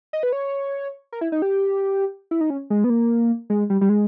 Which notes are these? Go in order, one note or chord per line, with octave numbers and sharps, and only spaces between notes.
D#5
B4
C#5
A#4
E4
D#4
G4
E4
D#4
C#4
G#3
B3
A#3
G#3
G3
G3
G#3